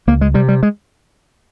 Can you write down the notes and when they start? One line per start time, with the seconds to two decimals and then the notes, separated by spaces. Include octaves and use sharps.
0.07 C#2 A#3
0.21 G#3
0.34 C3 G3
0.48 G3
0.63 G#3